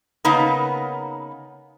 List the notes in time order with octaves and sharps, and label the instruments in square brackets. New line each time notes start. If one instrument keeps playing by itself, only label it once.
[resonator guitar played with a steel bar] C#3 A#3 B3 D#4